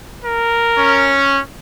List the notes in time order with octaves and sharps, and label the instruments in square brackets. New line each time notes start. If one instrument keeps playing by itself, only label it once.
[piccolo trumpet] A#4
[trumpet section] C#4